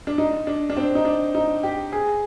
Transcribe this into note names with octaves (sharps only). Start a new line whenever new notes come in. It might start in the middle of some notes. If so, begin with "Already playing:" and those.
D4
D#4
D4
D4
C4
D#4
D4
D#4
G4
G#4